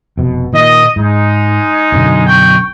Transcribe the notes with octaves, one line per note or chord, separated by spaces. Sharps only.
F1 B2
A#2 D#3 A#3 D#5
G#2 G#3 D#4
B1 F#2 D3
G5 C#6